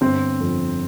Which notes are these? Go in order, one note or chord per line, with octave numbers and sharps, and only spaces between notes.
G1 C4 C5
F2